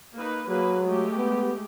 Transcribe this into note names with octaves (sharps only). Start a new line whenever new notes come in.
A#3 D#4 B4
F#3 A#3 G#4 B4
G#3 A3 G4
B3